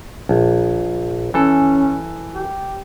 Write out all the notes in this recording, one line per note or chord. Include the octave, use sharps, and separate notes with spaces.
A#1
E3 C#4 A4
G4